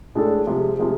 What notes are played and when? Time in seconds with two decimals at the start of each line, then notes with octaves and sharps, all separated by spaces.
0.15 A2 G#3 D4 A4
0.47 C3 F3 G#3
0.78 C3 F3 G#3